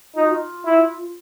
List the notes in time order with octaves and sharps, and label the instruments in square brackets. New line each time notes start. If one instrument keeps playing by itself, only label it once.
[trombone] D#4 [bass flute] F4
[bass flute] F#4
F4
[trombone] E4